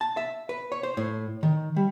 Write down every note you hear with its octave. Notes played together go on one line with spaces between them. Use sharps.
A5
E5
B4
C#5
C5
A2
D#3
G3